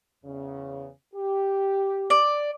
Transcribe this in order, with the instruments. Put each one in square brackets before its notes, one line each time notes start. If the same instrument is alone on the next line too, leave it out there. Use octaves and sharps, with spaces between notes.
[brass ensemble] E2 C#3
G4
[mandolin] D5